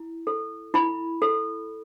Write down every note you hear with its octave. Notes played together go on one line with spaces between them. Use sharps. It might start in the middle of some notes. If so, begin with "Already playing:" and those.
Already playing: E4
A4
E4 B5
A4